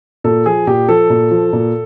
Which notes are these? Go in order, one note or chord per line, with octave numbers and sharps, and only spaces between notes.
A#2 A4
F3 G#4
A#2 G4
F3 A4
A#2
F3
A#2